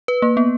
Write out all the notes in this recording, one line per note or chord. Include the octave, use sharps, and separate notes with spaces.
B4
A#3
B3